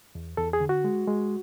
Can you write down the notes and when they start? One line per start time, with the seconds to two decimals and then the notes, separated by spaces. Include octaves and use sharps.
0.15 E2
0.37 E2 A4
0.53 G#4
0.60 D3
0.69 F#4
0.84 G#3
1.08 G#3